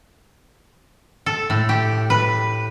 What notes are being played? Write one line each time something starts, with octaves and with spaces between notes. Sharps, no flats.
A4
A2
G4
B4